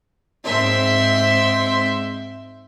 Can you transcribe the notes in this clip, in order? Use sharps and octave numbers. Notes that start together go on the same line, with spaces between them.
G#2 C4 E5 C6